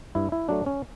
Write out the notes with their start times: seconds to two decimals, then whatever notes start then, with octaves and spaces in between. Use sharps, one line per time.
0.15 G2 E4
0.32 E4
0.49 F#3 A3 D4
0.66 C#4